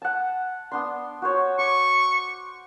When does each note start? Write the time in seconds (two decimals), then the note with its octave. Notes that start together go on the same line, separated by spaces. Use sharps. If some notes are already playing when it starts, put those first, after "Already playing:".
0.02 F#5 A5
0.71 B3 D4 C6
1.22 F#4 C5 C#5
1.59 C#6 D6